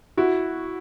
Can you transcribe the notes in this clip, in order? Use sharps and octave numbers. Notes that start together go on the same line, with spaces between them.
E4 F#4